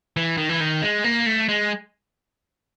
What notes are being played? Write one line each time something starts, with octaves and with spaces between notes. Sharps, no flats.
E3
D#3
E3
D#3
G#3
A#3
A3
G#3